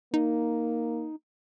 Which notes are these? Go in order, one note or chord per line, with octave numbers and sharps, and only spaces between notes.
A#3 D#4